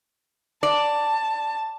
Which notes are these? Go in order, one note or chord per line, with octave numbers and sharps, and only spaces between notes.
D5 A5